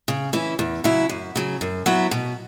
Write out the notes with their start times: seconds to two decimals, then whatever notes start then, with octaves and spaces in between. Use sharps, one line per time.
0.08 C#3
0.33 E3 C#4 E4
0.59 E2
0.84 C#3 F#3 E4
1.09 F#2
1.36 C#3 F#3
1.61 F#2
1.86 F#3 B3 E4
2.11 B2